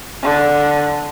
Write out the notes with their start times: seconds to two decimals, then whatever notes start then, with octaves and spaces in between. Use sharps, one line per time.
0.23 D3